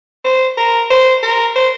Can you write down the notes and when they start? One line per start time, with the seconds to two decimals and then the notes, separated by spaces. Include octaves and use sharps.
0.24 C5
0.57 A#4
0.90 C5
1.23 A#4
1.55 C5